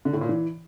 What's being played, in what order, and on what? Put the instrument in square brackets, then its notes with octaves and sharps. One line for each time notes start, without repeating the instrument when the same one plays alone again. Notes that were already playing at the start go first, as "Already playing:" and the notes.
[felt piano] D3
A2
A#2
E3